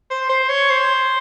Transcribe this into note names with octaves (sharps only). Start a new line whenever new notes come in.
C5
C5
C#5
C5